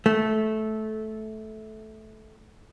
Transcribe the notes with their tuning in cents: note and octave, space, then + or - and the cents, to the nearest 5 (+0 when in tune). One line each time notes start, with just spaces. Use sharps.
A3 -15